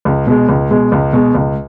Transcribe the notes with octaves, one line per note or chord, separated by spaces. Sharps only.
C#2
B2 G#3
C#2
B2 G#3
C#2
B2 G#3
C#2